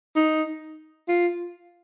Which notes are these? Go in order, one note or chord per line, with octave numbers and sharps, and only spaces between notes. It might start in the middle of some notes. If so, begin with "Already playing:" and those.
D#4
F4